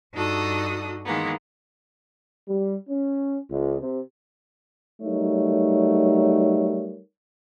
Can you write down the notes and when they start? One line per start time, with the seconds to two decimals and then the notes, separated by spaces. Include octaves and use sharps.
0.13 G2 D4 D#4 F#4 A4 D#6
1.04 D#3 E3 G#3 A#3 B3
2.48 G3
2.89 C#4
3.49 C#2
3.79 C3
5.02 F#3 G3 A3 D#4 A#4 C#5